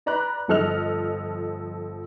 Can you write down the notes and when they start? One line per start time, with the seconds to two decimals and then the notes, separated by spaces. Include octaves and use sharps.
0.06 B4 D5 A#5 B5 F#6
0.48 G1 F3 A4 D#5 F6 F7